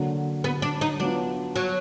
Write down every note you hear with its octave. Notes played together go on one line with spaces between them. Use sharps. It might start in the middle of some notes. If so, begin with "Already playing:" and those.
Already playing: D3 F#3 A#3
B3
D4
D#4
F#3 B3 D4 F4
F#3